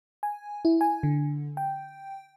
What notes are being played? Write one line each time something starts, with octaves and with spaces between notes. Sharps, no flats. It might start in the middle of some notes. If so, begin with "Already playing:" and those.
G#5
E4
G#5
D3
G5